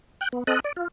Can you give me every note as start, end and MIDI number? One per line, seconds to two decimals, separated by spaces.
0.21 0.28 79
0.21 0.28 90
0.33 0.44 59
0.47 0.60 60
0.47 0.60 69
0.47 0.60 75
0.47 0.60 90
0.64 0.72 74
0.76 0.88 65